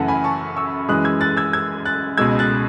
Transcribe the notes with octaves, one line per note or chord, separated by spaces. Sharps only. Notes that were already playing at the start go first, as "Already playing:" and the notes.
Already playing: F#2 C#3 E3 A3 F#5 A5
G#5 B5
A5 C#6
C#6 E6
F#2 E3 G#3 D#6 F#6
E6 G#6
F#6 A6
E6 G#6
E6 G#6
F#6 A6
C#2 B2 G#3 E6 G#6
F#6 A6